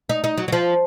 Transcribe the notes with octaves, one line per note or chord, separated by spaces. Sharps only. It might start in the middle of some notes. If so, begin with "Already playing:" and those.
D#4
D#4
F#3
F#3
F3